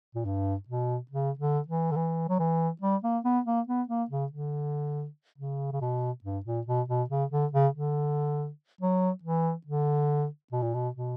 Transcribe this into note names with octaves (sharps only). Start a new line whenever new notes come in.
A#2
G2
B2
C#3
D3
E3
D3
E3
F#3
E3
G3
A#3
B3
A#3
B3
A#3
C#3
D3
C#3
C#3
B2
G2
A#2
B2
B2
C#3
D3
C#3
D3
F#3
E3
D3
B2
A#2
B2
B2